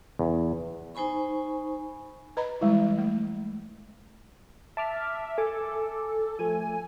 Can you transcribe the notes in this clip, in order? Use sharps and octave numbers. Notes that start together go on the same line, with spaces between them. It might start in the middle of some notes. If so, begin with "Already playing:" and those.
E2
D#4 C5 G#5 B5 C#6
B4 D#5 A#5 B5
E3 G3 G#3 E4
A3
E5 A5 D6 F6
A4 G#5 D6
F3 A3 G#5